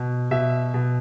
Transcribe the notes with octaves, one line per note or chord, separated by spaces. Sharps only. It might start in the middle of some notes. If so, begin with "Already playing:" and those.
Already playing: B2
B2 E5
B2